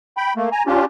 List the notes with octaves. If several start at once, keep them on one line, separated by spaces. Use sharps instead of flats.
G5 B5
A3 A#3
G#5 A#5
C#4 D4 F4 G4